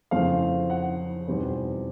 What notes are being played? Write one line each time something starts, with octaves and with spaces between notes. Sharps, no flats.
F2 C#3 E3 A3 C4 F5
F#5
E2 B2 G3 C4 D#4 C5